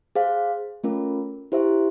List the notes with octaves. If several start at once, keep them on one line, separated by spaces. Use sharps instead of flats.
G#4 C5 F5
A3 C#4 F4 A#4
E4 G4 C5 E5